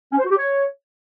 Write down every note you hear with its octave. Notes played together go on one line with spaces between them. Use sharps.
C#4
C5
F#4
G4
C#5